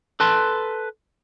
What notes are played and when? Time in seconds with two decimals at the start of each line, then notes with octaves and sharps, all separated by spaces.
0.20 A4 B4 A5 C6